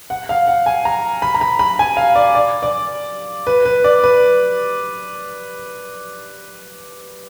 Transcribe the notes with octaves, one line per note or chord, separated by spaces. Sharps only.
F#5
F5
F#5
G#5
A#5
B5
A#5
B5
B5
G#5
F5
D5
D5
D5
B4
B4
D5
B4